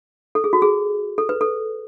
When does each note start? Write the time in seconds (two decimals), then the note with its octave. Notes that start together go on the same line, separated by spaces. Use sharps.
0.35 A4
0.44 G#4
0.53 F#4
0.62 G#4
1.18 A4
1.29 B4
1.41 A4